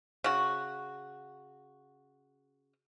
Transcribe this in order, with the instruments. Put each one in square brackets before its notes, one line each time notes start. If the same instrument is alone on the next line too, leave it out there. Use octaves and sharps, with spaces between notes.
[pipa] C#3 F#4